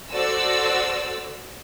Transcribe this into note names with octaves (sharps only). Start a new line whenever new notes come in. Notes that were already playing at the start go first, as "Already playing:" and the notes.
F#4 A4 C5 D5 E6